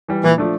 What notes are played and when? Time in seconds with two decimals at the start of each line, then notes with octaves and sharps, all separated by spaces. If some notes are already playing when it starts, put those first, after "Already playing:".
0.08 E3 G3
0.23 A#2 E3
0.38 F3 A3 D4